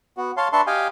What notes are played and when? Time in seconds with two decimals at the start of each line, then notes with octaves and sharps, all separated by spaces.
0.17 B3 F#4
0.37 C#5 F5 A5 C6
0.53 D4 B4 E5 A5 C6 C#6
0.67 G4 D#5 F5 G5 G#5